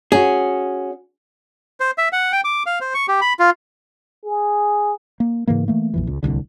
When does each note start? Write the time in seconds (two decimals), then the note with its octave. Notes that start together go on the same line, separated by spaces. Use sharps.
0.12 C#4 F#4 G#4
1.80 C5
1.98 E5
2.13 F#5
2.32 G5
2.44 D6
2.66 F5
2.81 C5
2.94 C#6
3.08 G4
3.21 B5
3.39 F4
4.25 G#4
5.20 A#3
5.47 G#2 C#3 E3 A#3
5.68 E3 A3 A#3
5.94 A#1 F2 E3
6.07 C#2
6.23 D1 G1 C2 D3